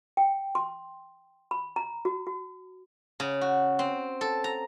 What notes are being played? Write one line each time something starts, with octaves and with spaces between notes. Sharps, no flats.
G5
C6
B5
A#5
F#4
F#4
C#3
F#4
C4
A4
A#5